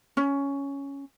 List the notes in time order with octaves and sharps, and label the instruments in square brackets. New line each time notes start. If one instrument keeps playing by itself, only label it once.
[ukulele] C#4